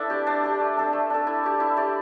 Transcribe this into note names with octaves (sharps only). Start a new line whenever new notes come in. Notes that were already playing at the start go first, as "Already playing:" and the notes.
Already playing: D4 E4 A4 B4 E5
G4 D5
D4
G4 D5
A3
D4 A4
A3
D4 A4
E4
G4 D5
E4
G4 D5